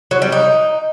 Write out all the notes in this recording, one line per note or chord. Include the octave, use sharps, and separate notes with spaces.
F#3
G3
D#4